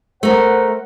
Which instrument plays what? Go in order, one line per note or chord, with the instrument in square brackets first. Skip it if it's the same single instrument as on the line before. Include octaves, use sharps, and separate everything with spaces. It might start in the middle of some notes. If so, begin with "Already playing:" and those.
[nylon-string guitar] A3 A#4 [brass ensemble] C5 F#5